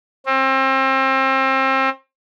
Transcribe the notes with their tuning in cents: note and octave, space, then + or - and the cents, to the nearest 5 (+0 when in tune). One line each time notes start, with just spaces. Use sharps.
C4 +30